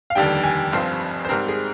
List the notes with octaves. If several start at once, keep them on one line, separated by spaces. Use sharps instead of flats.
F5
F1 D#2 D3 G3 G5
G#5
G#1 G2 F3 C4 F4
C5
G#2 G3 C4 A#4
G#4